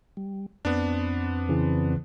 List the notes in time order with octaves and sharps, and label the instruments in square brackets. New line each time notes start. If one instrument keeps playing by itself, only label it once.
[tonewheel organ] G3
[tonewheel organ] F2 C4 [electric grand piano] B3 D4
[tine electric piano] C#3 E3